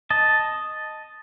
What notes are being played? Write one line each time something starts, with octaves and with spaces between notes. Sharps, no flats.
D#5 A5